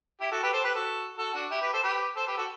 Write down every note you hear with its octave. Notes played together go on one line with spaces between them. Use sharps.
E4 G4
F#4 A4
G4 B4
A4 C5
G4 B4
F#4 A4
F#4 A4
D4 F#4
E4 G4
G4 B4
A4 C5
G4 B4
A4 C5
G4 B4
F#4 A4